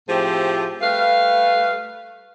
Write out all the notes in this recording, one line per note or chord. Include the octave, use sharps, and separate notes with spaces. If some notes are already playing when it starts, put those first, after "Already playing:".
A2 F3 C4 G4 G#4 E5
G3 A3 B4 F5